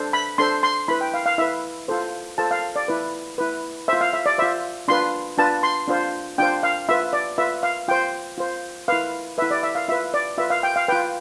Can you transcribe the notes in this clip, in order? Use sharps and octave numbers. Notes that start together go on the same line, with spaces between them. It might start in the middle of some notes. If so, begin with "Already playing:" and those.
Already playing: D4 A4 C5
B5
D4 A4 C5 C6
C6
E4 B4 B5
G5
F5
F5
E4 B4 E5
F4 A4 C5
F4 A4 C5 A5
F5
D5
E4 B4
E4 B4
F4 C5 E5
F5
E5
D5
F4 C5 E5
D4 F4 B4 C6
D4 F4 B4 A5
C6
D4 F4 C5
D4 F4 C5 G5
F5
F4 B4 E5
D5
F4 B4 E5
F5
F4 C5 G5
F4 C5
E4 B4 F5
E4 B4 E5
D5
E5
F5
F4 B4 E5
D5
F4 B4 E5
F5
G5
F5
F4 B4 G5